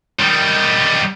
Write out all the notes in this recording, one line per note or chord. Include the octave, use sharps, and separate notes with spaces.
D#3 G3